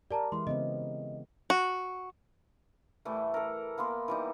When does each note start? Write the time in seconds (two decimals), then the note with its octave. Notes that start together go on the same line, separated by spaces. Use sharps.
0.11 G4 A#4 D5 A5 A#5
0.32 E3 G#3 E4 C6
0.47 C#3 B3 C4 D#5
1.50 F#4
3.05 A2 E3 G3 A3
3.34 A4 A#4
3.78 A#3 B3 B5 C6
4.08 E3 G3 D#4